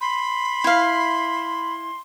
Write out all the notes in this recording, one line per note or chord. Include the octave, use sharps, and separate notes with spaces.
B5 C6
E4 F5